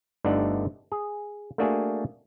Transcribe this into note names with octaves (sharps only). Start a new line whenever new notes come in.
G1 D3 A3 D4 D#4 F#5
G#4
A3 A#3 D4 F#4 G#4 G#5